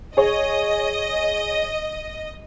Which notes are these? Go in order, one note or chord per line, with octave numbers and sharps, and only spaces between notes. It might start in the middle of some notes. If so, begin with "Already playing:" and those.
G#4 C#5 D#5